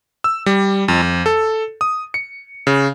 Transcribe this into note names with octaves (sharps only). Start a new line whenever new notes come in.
E6
G3
F2
F2
A4
D#6
C#7
C#3